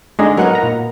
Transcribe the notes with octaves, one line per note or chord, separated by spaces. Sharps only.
D3 G#3 D4 D#4
F#3 B3 D#4 A#4 F#5
F#5 A#5
A#2